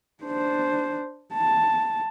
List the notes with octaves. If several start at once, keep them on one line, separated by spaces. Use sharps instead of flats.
D4 C5
A5